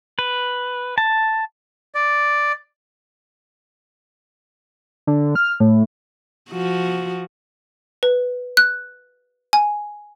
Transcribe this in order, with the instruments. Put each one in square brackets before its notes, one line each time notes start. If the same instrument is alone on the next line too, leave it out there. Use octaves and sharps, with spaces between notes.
[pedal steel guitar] B4
A5
[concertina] D5
[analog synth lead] D3
F6
A2
[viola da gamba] F3 F#4
[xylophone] B4
F#6
G#5